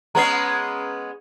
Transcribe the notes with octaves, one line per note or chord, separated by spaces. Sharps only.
G#3 B3 C#4 A#5 C7